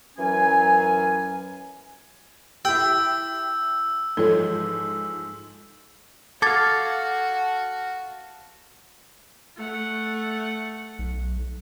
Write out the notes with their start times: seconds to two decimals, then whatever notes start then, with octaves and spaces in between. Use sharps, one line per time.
0.18 F#2 E3 F#3 C#4 G#5
2.65 E4 G4 G5 E6
4.17 G#2 E3 F3 A4 C#5
6.42 F#4 A4 F5 D6 G#6 A6
9.56 A3 F#5
10.99 B1